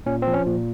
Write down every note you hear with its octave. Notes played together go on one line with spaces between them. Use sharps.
A#2 C#4
C4
F3
C#4
A#2